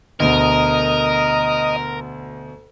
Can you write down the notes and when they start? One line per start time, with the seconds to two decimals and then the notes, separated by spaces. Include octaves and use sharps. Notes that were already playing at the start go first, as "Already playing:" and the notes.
0.20 D2 B2 A#4 D#5